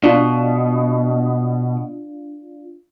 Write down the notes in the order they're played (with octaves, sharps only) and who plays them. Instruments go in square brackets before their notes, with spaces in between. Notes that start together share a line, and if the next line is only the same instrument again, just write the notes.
[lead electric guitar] B2 [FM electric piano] D4 F4